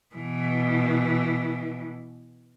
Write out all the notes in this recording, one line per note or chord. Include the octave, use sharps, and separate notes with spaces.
B2 E3